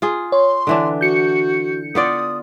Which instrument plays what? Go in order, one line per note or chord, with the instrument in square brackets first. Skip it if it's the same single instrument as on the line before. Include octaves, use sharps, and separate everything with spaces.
[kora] F4 G#4
[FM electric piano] C#5 [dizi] C6
[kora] D3 E3 D4
[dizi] F#4 [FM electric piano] G6 C#7
[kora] B3 F4 D5 [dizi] D#6